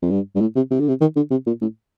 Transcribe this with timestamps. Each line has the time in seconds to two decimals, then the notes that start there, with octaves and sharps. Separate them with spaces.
0.02 F2
0.10 G2
0.35 G2
0.41 A2
0.56 C3
0.71 C3
0.80 D3
0.88 C3
1.01 D#3
1.16 D3
1.31 C3
1.46 A#2
1.61 A2